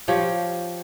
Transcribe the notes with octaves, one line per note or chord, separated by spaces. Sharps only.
F3 G4 C#5